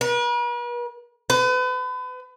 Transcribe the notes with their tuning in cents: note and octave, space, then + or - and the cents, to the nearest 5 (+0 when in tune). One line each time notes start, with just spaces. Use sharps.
B4 -45
B4 +35